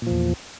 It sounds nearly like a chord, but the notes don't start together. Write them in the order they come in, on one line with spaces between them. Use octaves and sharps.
A#2 F3 E2